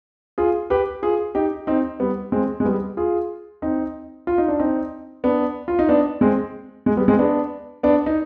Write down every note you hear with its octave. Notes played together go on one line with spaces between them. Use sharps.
F4 G#4
G4 B4
F4 G#4
D#4 G4
C4 D#4
G3 B3
G#3 C4
G#3
G3 B3
F4 G#4
C4 D#4
F4
D#4
D4
C4 D#4
B3 D4
F4
D#4
B3 D4
G#3 C4
G#3
G3 B3
G#3 C4
B3 D4
B3 D4
D#4